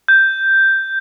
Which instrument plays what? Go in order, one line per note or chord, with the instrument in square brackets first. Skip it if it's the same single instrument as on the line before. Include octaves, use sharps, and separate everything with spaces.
[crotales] G6